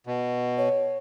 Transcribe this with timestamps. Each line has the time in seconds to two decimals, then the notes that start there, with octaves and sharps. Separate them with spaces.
0.07 B2
0.58 C#5